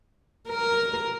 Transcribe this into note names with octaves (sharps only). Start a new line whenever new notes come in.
A#4